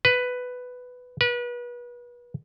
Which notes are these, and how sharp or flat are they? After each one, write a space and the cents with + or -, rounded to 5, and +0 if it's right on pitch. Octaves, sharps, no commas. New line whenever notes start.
B4 +10
B4 -30